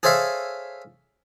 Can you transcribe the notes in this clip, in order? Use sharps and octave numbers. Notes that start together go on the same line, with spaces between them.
G#4 A4 C5 C#5 E5 F5